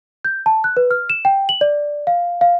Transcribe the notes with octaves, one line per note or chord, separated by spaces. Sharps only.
G6
A5
F#6
B4
F6
E7
G5
F#7
D5
F5
F5